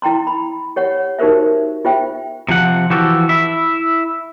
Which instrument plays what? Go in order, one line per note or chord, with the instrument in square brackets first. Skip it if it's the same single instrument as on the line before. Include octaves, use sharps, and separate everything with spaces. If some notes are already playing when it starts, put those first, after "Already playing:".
[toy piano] E4 G5 A#5 C6
B5
G4 C#5 F#5
D#4 F#4 G4 A#4 C5 E5
F4 G4 C5 E5 G5
[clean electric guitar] C3 F3 F#5
E3 F3 F#4 G4 A4
E4 E5